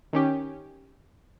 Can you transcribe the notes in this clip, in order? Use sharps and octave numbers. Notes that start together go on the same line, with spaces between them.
D#3 C#4 G4